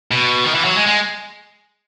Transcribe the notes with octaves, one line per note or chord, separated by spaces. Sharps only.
B2
D#3
E3
F#3
G#3
G#3